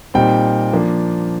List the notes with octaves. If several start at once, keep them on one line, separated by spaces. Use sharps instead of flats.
A#2 G3 C4 D#4 G5
F3 A#3 D4